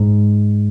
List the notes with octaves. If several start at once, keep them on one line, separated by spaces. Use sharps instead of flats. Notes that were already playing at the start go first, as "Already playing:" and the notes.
Already playing: G#2